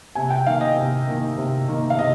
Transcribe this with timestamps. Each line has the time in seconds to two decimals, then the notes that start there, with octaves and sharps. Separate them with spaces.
0.15 C3 G#5
0.30 G5
0.46 D#3 A#3 F5
0.61 D#5
0.76 C3
1.08 D#3 A#3
1.38 C3
1.68 D#3 A#3
1.90 F5
1.99 C3 D#5